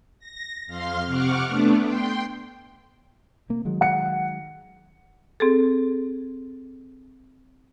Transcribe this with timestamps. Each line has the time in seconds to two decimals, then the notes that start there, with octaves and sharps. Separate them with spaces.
0.20 A#6
0.67 F2 F5 C6 F6
1.06 C3 F#5 C#6 D6 F6
1.47 A3 B3 D4
1.84 G5 C6
3.49 C3 A#3
3.65 D#3 F#3 G#3
3.81 F#5 C#7
5.40 C4 G#4 A4